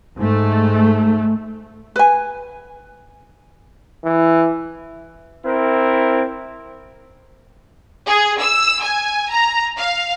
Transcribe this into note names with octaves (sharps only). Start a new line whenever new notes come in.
G#2 A3
B4 G#5
E3
C4 E4 A#4
G#4
E6
G#5
A#5
F5